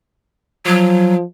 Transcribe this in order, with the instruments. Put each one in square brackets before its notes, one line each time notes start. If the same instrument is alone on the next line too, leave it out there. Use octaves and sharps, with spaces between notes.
[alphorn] F3 [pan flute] F#3